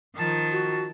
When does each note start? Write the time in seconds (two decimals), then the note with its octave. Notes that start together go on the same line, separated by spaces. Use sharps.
0.18 D#3 F3 A5
0.52 F#4